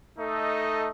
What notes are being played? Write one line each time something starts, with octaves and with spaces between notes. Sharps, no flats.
A3 D#4 A4 D#5